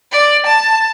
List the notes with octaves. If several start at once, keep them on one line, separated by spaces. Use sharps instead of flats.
D5
A5